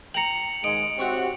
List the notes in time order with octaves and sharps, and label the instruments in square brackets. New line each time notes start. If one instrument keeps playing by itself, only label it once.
[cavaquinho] G5 A#5 [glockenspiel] C#7 F7 F#7
[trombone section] G#2 D#3 G#3 [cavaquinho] D#5 [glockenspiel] D7
[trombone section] C4 F#4 G4 [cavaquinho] C#5 E5 F#5